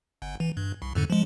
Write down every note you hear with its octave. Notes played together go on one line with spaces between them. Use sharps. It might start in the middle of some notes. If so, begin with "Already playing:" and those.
G1
E3
G2
C2
F2 G#2 D3
F3 G#3